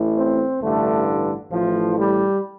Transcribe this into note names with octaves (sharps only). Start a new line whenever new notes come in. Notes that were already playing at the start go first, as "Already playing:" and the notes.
Already playing: A1 A2
C4
A1 G2 D3 A3
A1 A2 F3
G3